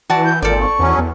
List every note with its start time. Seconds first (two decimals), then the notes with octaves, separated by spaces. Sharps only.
0.10 E3 F#4 D5 A5
0.25 G6
0.42 G#1 A#2 A4 A#4 D5
0.61 C#6
0.79 E2 F#3 C#4
0.98 E2